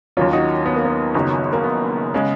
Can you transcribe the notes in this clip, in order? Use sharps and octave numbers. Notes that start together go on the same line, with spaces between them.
D#2 D#3 F#3 C#4 F4
D#4 F#4
B3
A#3
B3
F#1 F#2 D#3 F#3
A#3
B3
C#3 G#3